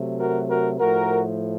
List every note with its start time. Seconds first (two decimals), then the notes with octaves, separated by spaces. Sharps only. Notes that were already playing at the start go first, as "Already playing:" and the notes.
Already playing: C3 F#3 A3
0.20 F#4 A#4
0.50 F#4 A#4
0.79 A2 F3 A3 F#4 A#4